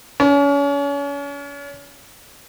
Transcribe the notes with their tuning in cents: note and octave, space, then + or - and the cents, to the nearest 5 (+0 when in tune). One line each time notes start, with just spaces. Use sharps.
C#4 +35